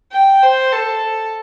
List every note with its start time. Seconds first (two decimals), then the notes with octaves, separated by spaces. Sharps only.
0.12 G5
0.43 C5
0.72 A4